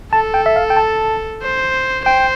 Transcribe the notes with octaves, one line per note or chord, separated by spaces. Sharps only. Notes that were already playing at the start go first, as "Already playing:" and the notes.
A4 A5
G5
E5
F5
G5
A5
C5
C5 G5